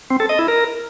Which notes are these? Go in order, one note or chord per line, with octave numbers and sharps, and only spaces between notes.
C4
A4
D#5
E4
A#4